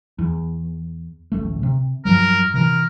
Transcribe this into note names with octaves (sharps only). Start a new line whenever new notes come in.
E2
D1 A1 A3
C3
G2 F3 F#3 A#4
C3 E3 A#4